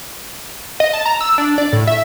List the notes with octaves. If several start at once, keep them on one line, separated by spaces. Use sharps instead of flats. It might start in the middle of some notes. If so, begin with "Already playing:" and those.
D#5
A5
A#5
E6
D4
D5
A2
E5